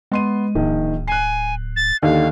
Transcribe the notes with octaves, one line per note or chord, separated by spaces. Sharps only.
G#3 B3 C6 D#7
D1 A#1 D#3
G#5 F#6 C7
A6
D#2 D3 D#3 F5